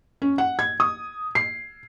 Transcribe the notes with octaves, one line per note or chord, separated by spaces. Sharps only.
C#4
F#5
G#6
D#6
C7